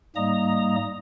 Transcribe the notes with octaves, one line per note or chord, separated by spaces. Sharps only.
G#2 G3 A#3 D#5 A#5 D#6